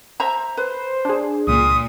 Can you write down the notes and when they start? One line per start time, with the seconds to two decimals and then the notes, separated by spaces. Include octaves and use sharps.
0.20 C5 E5 A#5
0.57 B4 C5
1.05 D4 G#4
1.47 C#2 A#2 D#6